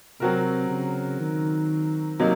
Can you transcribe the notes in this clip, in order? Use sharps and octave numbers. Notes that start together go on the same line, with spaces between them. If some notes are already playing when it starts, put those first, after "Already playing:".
C3 F#3 C4 F#4 A#4
C#3
D#3
C3 F#3 A#3 D#4